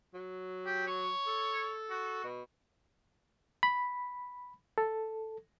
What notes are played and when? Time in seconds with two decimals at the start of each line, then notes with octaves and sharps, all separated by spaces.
0.14 F#3
0.66 G4
0.87 C#5
1.27 A4
1.90 F#4
2.24 B2
3.63 B5
4.78 A4